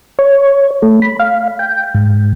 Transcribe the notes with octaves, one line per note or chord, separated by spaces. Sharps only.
C#5
A3
B5
F5
G5
G#2